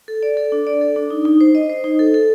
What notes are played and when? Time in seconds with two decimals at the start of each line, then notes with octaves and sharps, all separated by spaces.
0.08 A4
0.23 D5
0.37 A4
0.52 D4
0.67 D5
0.81 A4
0.96 D4
1.10 D#4
1.25 D#4
1.41 C5
1.55 D#5
1.69 C5
1.84 D#4
1.99 A4
2.14 A4